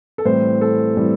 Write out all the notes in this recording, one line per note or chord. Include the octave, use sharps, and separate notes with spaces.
A4
A2 E3 G3 C4 C5
A4
A2 E3 G3 C4